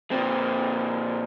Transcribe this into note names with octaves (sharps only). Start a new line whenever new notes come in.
A#2 C4